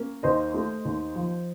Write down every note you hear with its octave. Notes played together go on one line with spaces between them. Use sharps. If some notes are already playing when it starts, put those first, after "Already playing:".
Already playing: A#3 C#4
D#2 C5 D#5
A3
D#2
F3